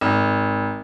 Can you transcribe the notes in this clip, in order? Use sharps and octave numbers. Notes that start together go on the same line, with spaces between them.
G#1